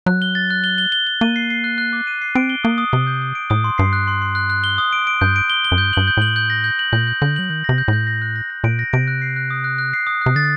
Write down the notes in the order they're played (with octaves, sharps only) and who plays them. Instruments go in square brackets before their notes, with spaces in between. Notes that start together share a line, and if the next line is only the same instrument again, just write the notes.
[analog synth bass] F#3 [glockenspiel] F#6
[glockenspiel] G7
A6
F#6
G7
G7
G7
G7
[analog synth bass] A#3 [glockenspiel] D#7
[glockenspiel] C7
C7
F#6
F#6
D6
D#7
C7
[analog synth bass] C4 [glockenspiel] D7
[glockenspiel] G7
[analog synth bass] A#3 [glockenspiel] D#6
[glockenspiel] D#6
[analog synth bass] C3 [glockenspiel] G7
[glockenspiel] G6
D#6
D7
[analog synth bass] A2 [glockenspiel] D#6
[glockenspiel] C6
[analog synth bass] G2 [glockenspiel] C7
[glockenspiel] F#6
C6
C6
F#6
F#6
G7
D#6
D7
D7
[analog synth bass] G2 [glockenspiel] G6
[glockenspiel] D7
G7
G7
[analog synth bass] F#2
[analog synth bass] G2 [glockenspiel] G6
[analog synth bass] G2 [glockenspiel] F#7
[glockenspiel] G6
[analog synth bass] A2 [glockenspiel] F#7
[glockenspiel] G6
A#6
G6
F#7
[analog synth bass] A#2 [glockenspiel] G6
[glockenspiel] G6
[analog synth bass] D3 [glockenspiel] G6
[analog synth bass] F#3 [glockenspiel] F#7
[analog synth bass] D#3 [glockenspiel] G6
[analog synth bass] C3 [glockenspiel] A#6
[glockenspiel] G6
[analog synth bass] A2
[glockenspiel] G6
A#6
F#6
A#6
A#6
[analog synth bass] A#2 [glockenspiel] D7
[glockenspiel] A#6
[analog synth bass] C3 [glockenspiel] D7
[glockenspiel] F#6
C7
F#6
D#6
F#6
F#6
C7
D#6
[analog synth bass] C3 [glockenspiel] F#6
[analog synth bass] D3 [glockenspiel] A6